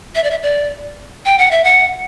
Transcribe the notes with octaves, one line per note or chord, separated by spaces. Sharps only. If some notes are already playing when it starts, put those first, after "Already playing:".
E5
D5
E5
D5
G5
F#5
E5
F#5